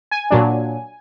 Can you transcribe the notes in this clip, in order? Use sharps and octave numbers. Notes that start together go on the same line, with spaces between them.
G#5
A#2 F#3 D4